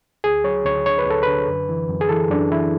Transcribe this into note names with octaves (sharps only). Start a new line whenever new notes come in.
D2 G#4
F#3 C#5
D2 C#5
D3 C#5
B4
D2 A4
D3 B4
F#2
E3
F#2
G#4
E3 A4
F#2 D4
E3 E4